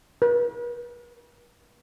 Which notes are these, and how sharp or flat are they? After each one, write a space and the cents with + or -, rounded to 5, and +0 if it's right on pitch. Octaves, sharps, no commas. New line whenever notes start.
B4 -45